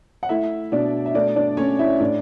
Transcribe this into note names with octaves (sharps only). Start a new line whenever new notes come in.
F#5
A3 E4 E5
B2 D4 D5
E5
A3 D4 D5
D4 D5
A3 C#4 C#5
E4 E5
A2 D4 D5